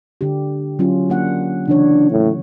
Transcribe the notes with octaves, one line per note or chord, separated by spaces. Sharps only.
D3 D4 G4
F#3 C#4 F4
A#3 D4 F#5
C#3 E3 D4 C#5
A2